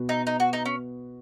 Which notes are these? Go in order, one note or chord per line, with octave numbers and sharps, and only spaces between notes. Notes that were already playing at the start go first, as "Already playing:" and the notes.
Already playing: B2 B3 F#4 B4
D#4
D#4
F#4
D#4
C#4